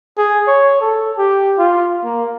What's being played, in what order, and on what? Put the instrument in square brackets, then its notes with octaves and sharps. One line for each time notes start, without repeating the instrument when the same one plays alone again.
[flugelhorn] G#4
C#5
A4
G4
F4
A#3